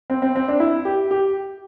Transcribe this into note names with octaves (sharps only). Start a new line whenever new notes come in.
C4
C4
C4
D4
E4
G4
G4